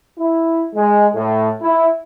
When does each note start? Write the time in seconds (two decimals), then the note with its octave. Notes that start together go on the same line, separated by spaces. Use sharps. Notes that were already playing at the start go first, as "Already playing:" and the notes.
0.19 E4
0.75 G#3
1.15 A2
1.61 E4